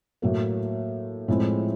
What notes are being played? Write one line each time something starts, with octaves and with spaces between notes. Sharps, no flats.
A2 F#3 A#3
A2 F3 G#3 C4 E4